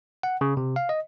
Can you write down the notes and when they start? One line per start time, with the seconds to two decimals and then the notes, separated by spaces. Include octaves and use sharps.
0.23 F#5
0.41 C#3
0.57 C3
0.76 F5
0.89 D#5